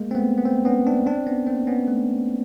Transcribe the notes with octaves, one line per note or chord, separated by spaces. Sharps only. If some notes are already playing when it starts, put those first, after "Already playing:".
Already playing: G#3 A#3
C4
A3 B3
B3
A#3 C4
B3 C#4
C4 D4
C4 D4
B3 C#4
A#3 C4
B3 C#4
A3